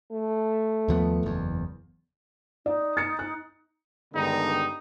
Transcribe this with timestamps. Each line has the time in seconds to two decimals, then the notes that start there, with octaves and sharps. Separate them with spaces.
0.12 A3
0.88 D#2 F3 B3
1.23 F#1 E2
2.66 D#4 D5
2.97 A6 C#7
3.19 F#6
4.13 G2 D3 D#3 G#3 B3 D#4